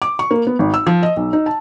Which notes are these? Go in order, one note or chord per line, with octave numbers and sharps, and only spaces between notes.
D6
C#6
A#3
B3
G#1
E6
F3
D#5
B1
D#4
A5